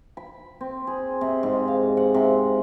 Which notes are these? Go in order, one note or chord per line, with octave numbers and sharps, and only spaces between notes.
B5
C4
G#4
C3
G#2
F5
F#5
C3